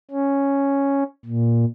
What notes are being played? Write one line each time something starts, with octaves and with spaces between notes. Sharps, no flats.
C#4
A#2